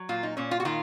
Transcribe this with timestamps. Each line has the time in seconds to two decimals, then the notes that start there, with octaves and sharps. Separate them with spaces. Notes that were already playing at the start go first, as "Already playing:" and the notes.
Already playing: F#3
0.09 A#2 F4
0.23 D#4
0.37 A#2 C#4
0.51 F4
0.60 F#4
0.65 D#3 F4